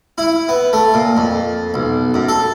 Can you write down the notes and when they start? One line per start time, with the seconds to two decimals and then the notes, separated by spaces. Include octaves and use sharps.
0.18 E4
0.49 B3
0.73 A3
0.94 A#2
1.17 F2
1.74 B1
2.14 F#2
2.29 A4